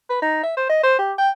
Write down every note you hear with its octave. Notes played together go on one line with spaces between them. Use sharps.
B4
D#4
E5
C5
D#5
C5
G4
G5